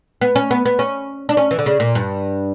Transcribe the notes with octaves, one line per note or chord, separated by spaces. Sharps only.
B3
C#4
B3
B3
C#4
D4
C#4
E3
D3
C#3
A#2
G2